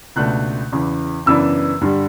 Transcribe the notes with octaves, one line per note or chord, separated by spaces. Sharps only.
C#2 B2 A3 D4 F#6
E2 C#3 E3
F#2 C#3 E3 B3 D4 E6
G2 D3 G3